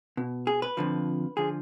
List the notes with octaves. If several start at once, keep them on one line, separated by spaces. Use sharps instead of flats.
B2
G#4
B4
F2 D3 F3
D3 F3 G#4